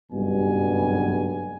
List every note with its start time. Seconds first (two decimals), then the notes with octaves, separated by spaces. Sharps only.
0.11 F#1 B1 G2 B2 G3 G#5